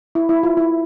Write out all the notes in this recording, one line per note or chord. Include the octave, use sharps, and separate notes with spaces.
E4
E4
F4
E4